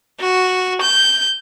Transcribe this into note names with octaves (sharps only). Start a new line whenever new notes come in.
F#4
G6